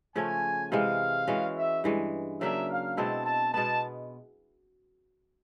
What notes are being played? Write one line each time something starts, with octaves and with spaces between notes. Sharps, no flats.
C#3 F3 A3 C#4 G#5
C3 E3 G#3 F5
E3 G#3 C#4 F#4
E5
G2 E3 G#3
C#3 F#3 A#3 D4 E5
F5
B2 G#3 C4 E4 A5
A5
B2 G#3 B3 A5